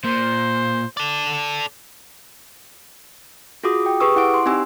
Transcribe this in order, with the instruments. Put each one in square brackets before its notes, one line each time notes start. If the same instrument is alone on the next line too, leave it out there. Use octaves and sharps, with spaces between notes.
[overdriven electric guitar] A#2 [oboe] C5
[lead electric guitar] A4 D5
[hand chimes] F4 F#4 G#4 D6 D#6
G5
G4 G#4 B4 C#6 D#6 E6
E4 F#5 D6 D7
C6
C4 D#4 G4 G#5 E6